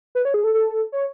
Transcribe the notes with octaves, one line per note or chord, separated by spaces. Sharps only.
B4
C#5
G#4
A4
A4
C#5